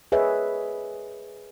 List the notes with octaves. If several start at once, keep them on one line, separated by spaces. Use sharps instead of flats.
G#4 A#4 B4 C#5 D#5 E5